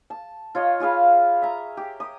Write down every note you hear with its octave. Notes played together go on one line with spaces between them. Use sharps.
A5
F4 C#5 D#5
F4 G#4 F5 B5
E5 A#5
G4
D#6